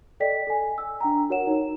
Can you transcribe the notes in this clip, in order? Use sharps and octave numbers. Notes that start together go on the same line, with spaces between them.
A4 D5 D#5 G5 B6
A4 G#5
E6
D4 G5 A#5
F#4 A#4 C#5 F#5 E7
D#4